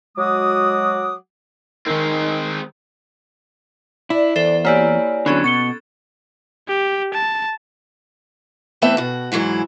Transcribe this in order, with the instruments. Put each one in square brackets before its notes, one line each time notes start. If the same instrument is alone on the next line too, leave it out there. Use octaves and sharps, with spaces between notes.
[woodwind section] F#3 G#3 F#4 F#5 D6 D#6
[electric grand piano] D#3 A#4 [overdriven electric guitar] G#3 C4 [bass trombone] D#4
[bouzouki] D4 [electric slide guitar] E4
[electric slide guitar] E2 [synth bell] A4 C5 E5
[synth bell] A#3 E4 G4 [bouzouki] F#4 B4 [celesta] C#5 D5 G#5
[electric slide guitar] D3 F#3 [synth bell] B3 C#4 A4
[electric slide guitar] B2 [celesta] C#6 C#7 G7 [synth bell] A6
[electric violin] G4
A5
[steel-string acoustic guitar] E2 A3 B3 C4 B4 E5
B2 F#4
G#2 E3 F#3 G#3 E4